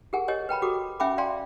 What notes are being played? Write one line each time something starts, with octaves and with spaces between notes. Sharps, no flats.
G4 G#4 A#4 F#5 G#5
G4 A#4 C#5 D#5 G#5
B4 G5 A#5 B5
F#4 G4 A4 D6
C#4 E5 G5 G#5 B5 D6
D5 F5 G5 G#5 A#5 C6